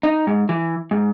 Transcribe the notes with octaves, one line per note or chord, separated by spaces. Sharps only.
D#4
G#2
E3
G#2